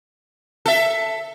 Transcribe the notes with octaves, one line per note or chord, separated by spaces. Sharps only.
A4 E5